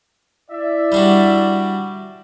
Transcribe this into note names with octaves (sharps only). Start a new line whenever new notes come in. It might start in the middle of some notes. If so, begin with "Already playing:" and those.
E4 D5 E5
G3 D4 F#4